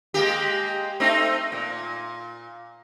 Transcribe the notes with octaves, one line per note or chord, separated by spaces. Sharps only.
G#3 A#3 G4
A3 C4 D#4
A#2